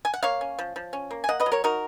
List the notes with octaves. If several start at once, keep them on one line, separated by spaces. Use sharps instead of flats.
G#5
F#5
A#3 C#5 F5
C#4
F3
F3
C#4
A#3
G#5
A#3 D#5 F#5
B4 D#5
F#3
A#4 C#5
D#4 F#4 A#4